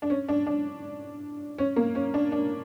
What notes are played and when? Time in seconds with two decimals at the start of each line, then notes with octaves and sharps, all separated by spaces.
0.02 D4
0.10 C#4
0.28 D4
0.47 D4
1.58 C#4
1.76 A#3
1.95 C#4
2.14 D4
2.32 D4